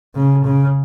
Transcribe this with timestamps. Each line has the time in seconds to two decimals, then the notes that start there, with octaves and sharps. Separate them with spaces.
0.15 C#3
0.44 C#3